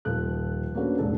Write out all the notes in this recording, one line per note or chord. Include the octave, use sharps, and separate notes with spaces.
D#1 F3 A4 F#6
A#3 C#4 D4 F#4 A4 B4
F1 C#2 A#2 D4 G#4 A4